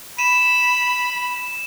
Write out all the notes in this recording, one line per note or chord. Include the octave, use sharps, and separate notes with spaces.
B5 D#7 E7